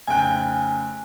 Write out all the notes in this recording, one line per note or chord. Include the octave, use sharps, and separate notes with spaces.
F1 C#3 G5 G#5 F#6